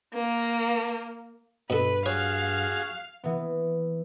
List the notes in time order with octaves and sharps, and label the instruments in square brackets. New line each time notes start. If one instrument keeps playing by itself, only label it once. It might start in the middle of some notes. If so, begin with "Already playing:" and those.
[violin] A#3
[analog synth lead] G2 [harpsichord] B2 A4 [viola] B4
[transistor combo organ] F#4 G#4 [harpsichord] C#5 [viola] F5
[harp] E3 B3